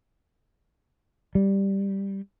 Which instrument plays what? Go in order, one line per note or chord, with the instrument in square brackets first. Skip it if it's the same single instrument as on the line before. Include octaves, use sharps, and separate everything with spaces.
[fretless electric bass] G3